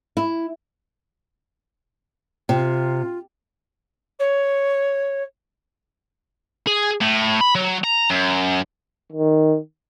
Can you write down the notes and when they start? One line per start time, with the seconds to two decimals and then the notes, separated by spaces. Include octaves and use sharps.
0.17 E4
2.49 C3 F4
4.19 C#5
6.67 G#4
7.01 A2
7.41 B5
7.55 F#3
7.84 A#5
8.11 F#2
9.12 D#3